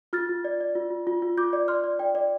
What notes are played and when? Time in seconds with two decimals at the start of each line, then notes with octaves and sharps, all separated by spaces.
0.13 F4 F6 A6
0.29 F4
0.45 D5
0.61 D5
0.75 F4
0.91 F4
1.07 F4
1.22 F4
1.38 F4 D6 G6
1.53 D5
1.68 D5 C6 F6
1.84 D5
1.99 D5 G5
2.15 D5